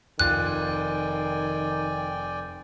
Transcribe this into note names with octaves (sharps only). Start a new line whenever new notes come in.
F1 D#3 F4 D5 G5 G#5 F#6 A6